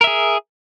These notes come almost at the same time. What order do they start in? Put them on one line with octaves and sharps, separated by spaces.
A#4 E5 G#4